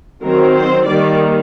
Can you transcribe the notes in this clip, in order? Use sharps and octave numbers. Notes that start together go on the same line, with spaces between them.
D#3 F#3 C4 A#4
C5
D#3 G3 A#3 D5